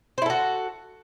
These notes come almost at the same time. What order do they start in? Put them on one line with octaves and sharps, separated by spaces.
C5 E4 A4 F#4